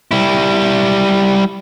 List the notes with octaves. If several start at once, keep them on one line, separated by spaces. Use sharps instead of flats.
G3 E4